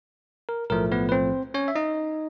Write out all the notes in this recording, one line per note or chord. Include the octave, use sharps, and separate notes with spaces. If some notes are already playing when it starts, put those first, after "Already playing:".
A#4
B1 A2 F3 A3 A#4
B3 B4
B4
C4 C5
C#4 C#5
E5
D#4 D#5